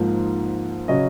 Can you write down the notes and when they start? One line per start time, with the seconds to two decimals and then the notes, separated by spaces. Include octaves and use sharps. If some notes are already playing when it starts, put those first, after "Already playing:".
Already playing: G#2 F3 A#3 D#4
0.88 C#3 F#3 C#4 D#5